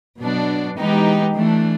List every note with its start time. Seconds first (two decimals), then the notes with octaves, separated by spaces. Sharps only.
0.21 B2 F#3 B3 D4
0.78 E3 G#3 B3 D#4 G4
1.35 E3 A3 D4